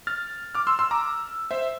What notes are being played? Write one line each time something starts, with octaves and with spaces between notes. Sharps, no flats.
F6 A6
D6 F6
C6 E6
C6 E6
A#5 D6
C5 E5